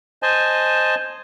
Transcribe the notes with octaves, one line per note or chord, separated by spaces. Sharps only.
C5 D#5 G#5 A5